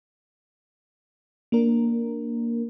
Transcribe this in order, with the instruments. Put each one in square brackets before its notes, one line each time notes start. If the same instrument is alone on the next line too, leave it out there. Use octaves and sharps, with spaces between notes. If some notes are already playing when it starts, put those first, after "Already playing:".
[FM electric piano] A#3 D4 A#4